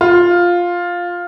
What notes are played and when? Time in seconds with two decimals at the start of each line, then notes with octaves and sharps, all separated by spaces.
0.01 F4